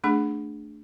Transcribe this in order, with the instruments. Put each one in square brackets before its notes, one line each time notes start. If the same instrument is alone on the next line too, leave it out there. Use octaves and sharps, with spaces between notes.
[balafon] A3 D4 G#4